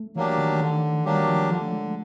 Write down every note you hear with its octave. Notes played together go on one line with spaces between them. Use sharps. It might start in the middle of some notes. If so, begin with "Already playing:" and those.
Already playing: A3
E3 F#3 A#3 D4 G4
D#3
D3 D#3
E3
F#3 G3 A#3 D4 G4
F3
D3 F3
A3
G#3